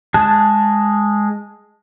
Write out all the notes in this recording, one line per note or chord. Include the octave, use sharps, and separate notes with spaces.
G#3 G#4 A5 F#6